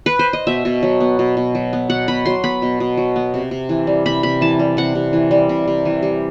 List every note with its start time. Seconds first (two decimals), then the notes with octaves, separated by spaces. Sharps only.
0.06 B4
0.19 C5
0.33 D#5
0.47 B2 E5
0.65 B2
0.83 F#3
1.00 B3
1.19 B2
1.37 B2
1.55 F#3
1.73 B3
1.90 B2 F#5
2.08 B2 B5
2.26 F#3 C6
2.44 B3 B5
2.62 B2
2.80 B2
2.97 F#3
3.16 B3
3.34 C3
3.51 C3
3.69 E3
3.87 G3
4.06 C3 B5
4.23 C3 B5
4.41 E3 A5
4.59 G3
4.77 C3 F#5
4.95 C3
5.13 E3
5.31 G3
5.49 C3
5.68 C3
5.85 E3
6.03 G3